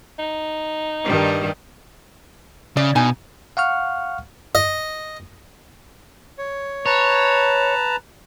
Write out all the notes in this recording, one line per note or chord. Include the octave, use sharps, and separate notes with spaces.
D#4
G2 D#3 G3
C#3 D5
B2 D#4 G#5
F5 F#5 C#6 F6
D#5
C#5
B4 C#5 A5 A#5